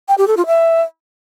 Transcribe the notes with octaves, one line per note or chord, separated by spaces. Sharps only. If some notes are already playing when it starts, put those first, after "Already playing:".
G5
G4
A4
F4
E5